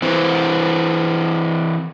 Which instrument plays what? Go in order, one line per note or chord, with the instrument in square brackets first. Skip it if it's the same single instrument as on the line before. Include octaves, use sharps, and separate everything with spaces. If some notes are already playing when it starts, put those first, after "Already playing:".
[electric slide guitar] E3 C4